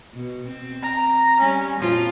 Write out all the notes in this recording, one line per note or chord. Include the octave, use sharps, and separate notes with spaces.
B2
C4
A#5
G3 C#4
F2 A#2 F3 F4